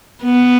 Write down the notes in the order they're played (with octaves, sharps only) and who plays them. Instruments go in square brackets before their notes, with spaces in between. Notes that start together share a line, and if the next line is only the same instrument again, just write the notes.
[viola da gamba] B3